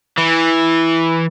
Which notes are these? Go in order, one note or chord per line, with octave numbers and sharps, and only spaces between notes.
E3